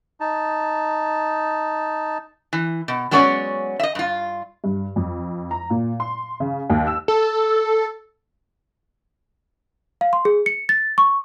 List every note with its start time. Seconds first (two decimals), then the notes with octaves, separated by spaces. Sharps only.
0.20 D#4 A5
2.53 E3
2.88 B2
3.11 F#3 G#3 B3 C#4 C#5 D5
3.80 D#5 E5
3.95 G2 F4
4.64 G2
4.96 F2
5.51 A#5
5.70 A#2
6.00 C6
6.40 C#3
6.70 D#2
6.87 E6
7.08 A4
10.01 F5
10.13 C6
10.25 G#4
10.46 C#7
10.69 A6
10.98 C#6